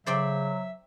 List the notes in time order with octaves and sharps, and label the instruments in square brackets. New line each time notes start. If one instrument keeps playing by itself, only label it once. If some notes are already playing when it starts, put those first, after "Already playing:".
[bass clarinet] C#3 [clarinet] F#3 [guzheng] C5 D5 G5 [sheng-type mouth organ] E5